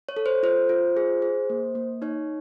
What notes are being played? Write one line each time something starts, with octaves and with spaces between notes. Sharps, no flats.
C#5
A4
C5
F4 C5
F4
G#4
G#4
A#3
A#3
D#4 C#5